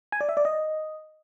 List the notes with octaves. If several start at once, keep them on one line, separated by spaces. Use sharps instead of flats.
G#5
D5
E5
D5
D#5